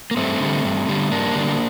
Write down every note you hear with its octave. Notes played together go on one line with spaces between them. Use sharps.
A#3
G2 A3 C4
D3 G3
G2
D3 G3
G2 A#3 D4
D3 G3